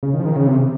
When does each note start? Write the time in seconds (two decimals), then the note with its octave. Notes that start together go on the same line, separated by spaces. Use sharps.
0.03 C#3
0.14 D#3
0.20 F3
0.25 D#3
0.36 C#3
0.47 C3